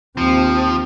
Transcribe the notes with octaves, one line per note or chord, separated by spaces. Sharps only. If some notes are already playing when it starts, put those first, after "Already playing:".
D#2 F3 C4